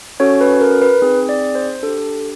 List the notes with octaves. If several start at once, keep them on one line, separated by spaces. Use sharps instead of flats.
C#4 F#4 A4 C#5
B4
A#4
B4
C4 D#4 G#4
D5
C5
D4 G4 A4